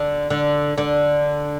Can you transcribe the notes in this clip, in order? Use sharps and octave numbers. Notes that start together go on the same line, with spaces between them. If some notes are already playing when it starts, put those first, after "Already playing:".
Already playing: D3
D3
D3